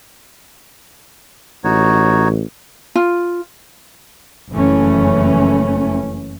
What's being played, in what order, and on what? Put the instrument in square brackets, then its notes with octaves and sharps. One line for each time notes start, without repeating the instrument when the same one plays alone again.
[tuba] A1 [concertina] D#4 F#4 C#5
[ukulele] F4
[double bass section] F#1 F2 E3 A3 C#4